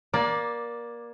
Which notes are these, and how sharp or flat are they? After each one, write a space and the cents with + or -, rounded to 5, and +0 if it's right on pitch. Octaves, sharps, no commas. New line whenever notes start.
A#3 +25 D5 +0